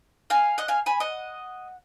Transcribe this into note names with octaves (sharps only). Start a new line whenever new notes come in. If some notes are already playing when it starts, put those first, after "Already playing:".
F5 G#5
D#5 F#5
F5 G#5
G#5 B5
D#5 F#5